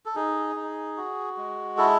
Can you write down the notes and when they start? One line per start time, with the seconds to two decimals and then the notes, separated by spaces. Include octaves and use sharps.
0.06 A4
0.15 D#4 G#4
0.56 D#4
0.97 F#4
1.37 G#3
1.78 E4 A4